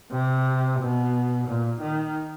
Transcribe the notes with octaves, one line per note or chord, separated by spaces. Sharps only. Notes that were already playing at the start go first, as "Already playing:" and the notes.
C3
B2
A#2
D#3